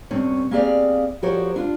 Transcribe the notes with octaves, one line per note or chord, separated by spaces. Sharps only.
G2 C3 C4 C#4 C#5
A#3 C4 G4 G#4 D5 F5
F3 F#4 G4 A#4 C5 C#5
D4 F4